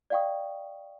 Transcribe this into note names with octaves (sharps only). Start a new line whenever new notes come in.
D5 D#5 F5 G5 C#6 D#6